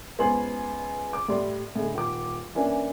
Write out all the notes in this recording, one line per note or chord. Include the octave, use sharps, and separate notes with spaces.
C#2 B3 C5 G#5 C6 F#7
D6
A2 G3 D5 C6
A2 D3 G#3
D#1 D6
E3 A#3 C#4 D4